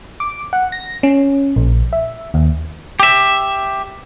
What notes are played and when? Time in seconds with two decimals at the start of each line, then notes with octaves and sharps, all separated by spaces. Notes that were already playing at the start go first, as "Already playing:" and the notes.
0.20 D6
0.53 F#5
0.72 A#6
1.03 C#4
1.56 A#1
1.93 E5
2.34 D#2
3.00 G4 E5